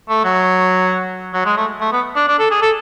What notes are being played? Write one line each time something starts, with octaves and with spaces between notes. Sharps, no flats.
A3
F#3
F#3
G#3
A3
A3
B3
D4
D4
A4
G#4
A4